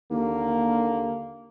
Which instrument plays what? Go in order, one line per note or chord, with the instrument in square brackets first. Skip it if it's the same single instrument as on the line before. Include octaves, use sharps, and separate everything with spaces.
[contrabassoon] D#2 [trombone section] D3 A#3